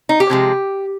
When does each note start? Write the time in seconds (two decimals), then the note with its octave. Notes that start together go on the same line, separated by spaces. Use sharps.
0.09 D#4
0.20 G4
0.30 C3 F3 G#3